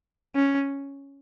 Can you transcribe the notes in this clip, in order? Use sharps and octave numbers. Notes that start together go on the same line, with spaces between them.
C#4